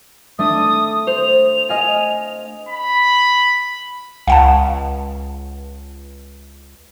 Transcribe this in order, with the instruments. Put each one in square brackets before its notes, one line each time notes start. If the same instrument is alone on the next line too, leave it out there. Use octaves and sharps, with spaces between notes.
[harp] A3 D4 [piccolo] D#6
[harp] C5 [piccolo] F7
[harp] D#5 F5 G#5
[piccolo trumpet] B5
[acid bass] C#2 [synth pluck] F5 F#5 A5